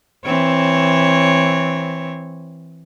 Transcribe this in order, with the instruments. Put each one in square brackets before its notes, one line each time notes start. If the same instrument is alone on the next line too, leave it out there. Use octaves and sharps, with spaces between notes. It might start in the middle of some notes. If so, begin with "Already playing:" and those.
[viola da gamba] E3 C4 C#5